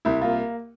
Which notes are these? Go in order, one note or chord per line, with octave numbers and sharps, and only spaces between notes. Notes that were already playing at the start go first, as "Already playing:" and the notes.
C2 E4
A#3 F4